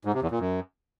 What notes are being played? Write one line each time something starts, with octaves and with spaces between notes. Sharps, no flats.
G#2
C3
E2
A#2
F#2